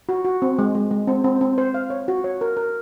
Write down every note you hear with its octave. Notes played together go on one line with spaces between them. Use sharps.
F#4
F#4
C4
G#3
G#3
G#3
C4
C4
C4
C5
F5
C#5
F#4
C#5
A#4
A#4